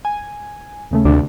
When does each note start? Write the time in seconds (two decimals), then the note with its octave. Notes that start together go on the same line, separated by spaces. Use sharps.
0.05 G#5
0.91 D#2 C#3 A3
1.05 D2 C3 D4